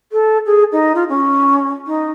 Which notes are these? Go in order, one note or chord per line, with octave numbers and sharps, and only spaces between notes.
A4
G#4
D#4
F4
C#4
D#4